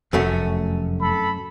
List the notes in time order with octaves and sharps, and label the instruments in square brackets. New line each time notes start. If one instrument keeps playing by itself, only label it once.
[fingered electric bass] F1 [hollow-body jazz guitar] F#2 A3 C#4
[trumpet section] A4 B5